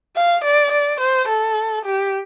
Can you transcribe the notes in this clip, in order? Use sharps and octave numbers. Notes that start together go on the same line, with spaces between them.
F5
D5
D5
C5
A4
G4